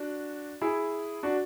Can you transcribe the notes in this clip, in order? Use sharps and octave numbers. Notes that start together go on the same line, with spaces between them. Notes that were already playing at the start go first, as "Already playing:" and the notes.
Already playing: D4 F#4
E4 G#4
D4 F#4